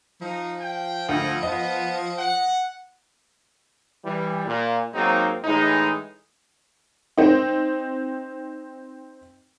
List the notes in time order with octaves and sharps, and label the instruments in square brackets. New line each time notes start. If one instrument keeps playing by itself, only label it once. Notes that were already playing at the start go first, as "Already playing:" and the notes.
[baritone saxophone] F3 [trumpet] D#4
[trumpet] G5
[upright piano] D2 [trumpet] D#5
[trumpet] B3 [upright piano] D#5
[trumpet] F#5
[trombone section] E3 G3
A#2
G#2 F#3 A#3 C4 D#4
A2 E3 G#3 D#4
[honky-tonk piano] C4 D#4